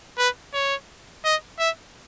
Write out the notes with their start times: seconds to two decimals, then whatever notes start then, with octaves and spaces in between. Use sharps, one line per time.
0.18 B4
0.54 C#5
1.24 D#5
1.59 E5